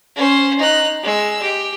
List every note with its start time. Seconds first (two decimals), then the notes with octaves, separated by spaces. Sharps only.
0.16 C#4 C5
0.59 D#4 F#6
1.03 G#3 E6
1.42 G4